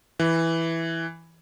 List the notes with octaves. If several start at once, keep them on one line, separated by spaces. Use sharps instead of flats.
E3